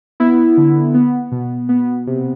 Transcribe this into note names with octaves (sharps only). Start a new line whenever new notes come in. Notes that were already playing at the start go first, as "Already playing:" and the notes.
B3 E4
D3
B3
B2
B3
C3